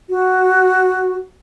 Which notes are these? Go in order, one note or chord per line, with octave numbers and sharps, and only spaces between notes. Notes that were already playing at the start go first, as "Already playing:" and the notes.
F#4